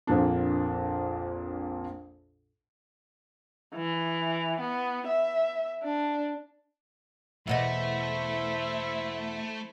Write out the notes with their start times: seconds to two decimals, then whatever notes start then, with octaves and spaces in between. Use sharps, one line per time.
0.07 A#1 F2 A#2 A#3 D4
3.75 E3
4.60 B3
5.08 E5
5.84 D4
7.48 E2 B2 A3 E4 C5 D#5 E5